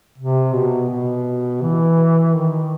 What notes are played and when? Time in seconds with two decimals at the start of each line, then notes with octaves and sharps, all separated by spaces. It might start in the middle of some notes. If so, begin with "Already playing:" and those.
0.18 C3
0.53 B2
0.90 B2
1.62 E3
2.35 D#3